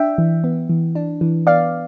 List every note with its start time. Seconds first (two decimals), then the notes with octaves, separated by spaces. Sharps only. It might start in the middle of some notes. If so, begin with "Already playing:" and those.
Already playing: D4 E5 G5
0.18 E3
0.44 B3
0.70 E3
0.95 D4
1.21 E3
1.47 B3 D5 F5